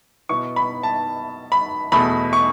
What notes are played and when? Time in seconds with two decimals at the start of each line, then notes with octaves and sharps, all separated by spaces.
0.29 B2 B3 E4 C#6
0.56 B5
0.83 A5
1.52 B5
1.92 E2 B2 A3 B5
2.33 C#6